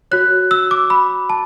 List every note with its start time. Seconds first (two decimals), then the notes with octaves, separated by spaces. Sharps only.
0.11 F#4 C#5 F#6
0.51 E6
0.71 D6
0.90 B5
1.30 A5